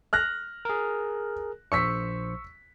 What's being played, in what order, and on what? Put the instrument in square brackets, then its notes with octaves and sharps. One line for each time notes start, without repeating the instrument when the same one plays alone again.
[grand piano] F6 F#6 A#6
[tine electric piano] G#4 A#4
[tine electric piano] A#1 C5 C#7 [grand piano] C#6 E6 B6